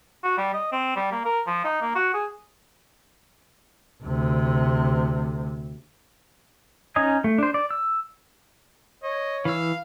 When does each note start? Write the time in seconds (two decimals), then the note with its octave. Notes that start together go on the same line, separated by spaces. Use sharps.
0.23 F#4
0.38 G3
0.54 D#5
0.72 C4
0.96 G3
1.12 A#3
1.25 A#4
1.47 F3
1.64 D#4
1.82 A#3
1.95 F#4
2.14 G#4
4.03 D2 C3
6.96 C#4 D#4 D#5 G#5
7.24 A3
7.38 D4 C5
7.54 D5
7.71 E6
9.03 C#5 D#5
9.45 E3 F5 E6